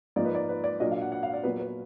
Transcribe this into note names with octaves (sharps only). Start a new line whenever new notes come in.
G#2 F3 A#3 D#4 D5
B4
D5
B4
D5
A#2 F#3 D4 D#5
F5
F#5
F#5
F5
D5
A#2 F#3 B3 B4
B4